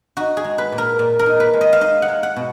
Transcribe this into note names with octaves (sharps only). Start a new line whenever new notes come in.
D#4 F#4
G#4
G#3
B4
A#2
A#4
A#2
A#4
D#4
B4
G#3
D#5
F5
D#4 D#5
F#5
G#3
F#5
B2